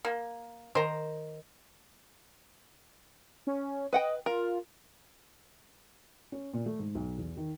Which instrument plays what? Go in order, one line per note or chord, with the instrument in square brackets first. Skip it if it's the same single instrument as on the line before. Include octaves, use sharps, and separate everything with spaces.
[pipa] A#3
[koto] D#3 [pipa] C5 A#5
[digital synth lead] C#4
[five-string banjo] B4 F#5 G5 [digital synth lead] D#5
[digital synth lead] F4 [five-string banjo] A#4
[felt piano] C#4
A#2
A3
G#2
B1
E2
D#3